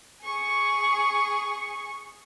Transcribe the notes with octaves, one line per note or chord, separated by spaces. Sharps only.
G#4 C#6